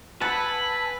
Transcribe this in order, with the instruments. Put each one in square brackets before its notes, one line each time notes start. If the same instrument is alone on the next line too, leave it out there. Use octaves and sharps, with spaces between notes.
[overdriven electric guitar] B4 [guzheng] F#5 [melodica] G#5 E6 [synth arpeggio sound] A5 B5